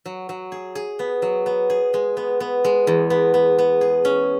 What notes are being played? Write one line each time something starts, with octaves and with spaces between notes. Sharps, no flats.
F#3
F#3
G#4
G#4
B3
F#3
B3
G#4
G#3
B3
B3
G#3
E2
B3
B3
B3
G#4
C#4